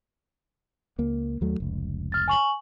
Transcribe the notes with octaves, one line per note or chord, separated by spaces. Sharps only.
C#2 A#3
D#2 F#3 A3
F1 C#2
F6 A6
G#5 C#6 F#7